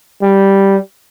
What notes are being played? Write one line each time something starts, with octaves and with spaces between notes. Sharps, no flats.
G3